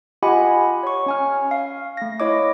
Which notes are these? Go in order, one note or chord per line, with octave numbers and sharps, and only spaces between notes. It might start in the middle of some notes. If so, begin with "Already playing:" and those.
F4 G4 D#5 F#5 G#5 B5
C#5 C#6
C#4 G#5 F6
F5
A3 A#6
E4 C#5 D#5 D6